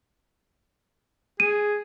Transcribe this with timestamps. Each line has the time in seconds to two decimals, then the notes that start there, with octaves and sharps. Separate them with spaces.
1.40 G#4 D#7